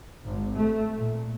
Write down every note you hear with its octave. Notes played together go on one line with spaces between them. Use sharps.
G#1
A3
A#2